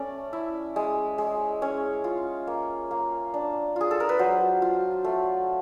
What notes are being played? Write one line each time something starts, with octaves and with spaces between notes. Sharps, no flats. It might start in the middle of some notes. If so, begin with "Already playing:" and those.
Already playing: A3 C#4 D5
E4
G#3
G#3
C#4 C#5
F4
A#3
A#3
D4
F4 G#4
A4
A#4
B4
F#3 C5
F4
A3